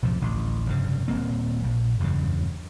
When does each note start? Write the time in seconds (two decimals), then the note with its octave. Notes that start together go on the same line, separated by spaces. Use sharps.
0.03 B1 F2 A2 F3
0.21 A1 D2
0.66 F1 G2 C#3
1.08 D#1 G#2 A#3 C4
1.64 A#1
2.00 F#1 E2 G2 C#3